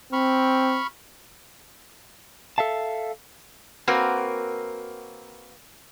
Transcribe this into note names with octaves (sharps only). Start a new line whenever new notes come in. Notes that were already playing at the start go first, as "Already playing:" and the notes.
C4 B5 C#6 F6
A4 E5 F5 A5
A#3 C4 F#4 A#4 B4